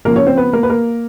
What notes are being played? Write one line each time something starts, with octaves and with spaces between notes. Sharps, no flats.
C#3 F3 A#3 A#4
C#4 C#5
C4 C5
B3 B4
A#3 A#4
B4
A#3 A#4